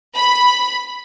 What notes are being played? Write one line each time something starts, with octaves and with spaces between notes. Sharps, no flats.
B5